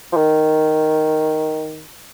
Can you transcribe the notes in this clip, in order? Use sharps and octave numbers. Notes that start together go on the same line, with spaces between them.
F3
D#3